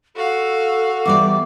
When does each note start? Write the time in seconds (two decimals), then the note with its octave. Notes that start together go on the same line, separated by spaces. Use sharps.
0.16 F#4 A4 F5
1.06 E2 G3 D5 D6